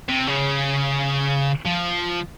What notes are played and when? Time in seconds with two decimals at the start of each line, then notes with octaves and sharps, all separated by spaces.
0.08 C3
0.27 C#3
1.65 F3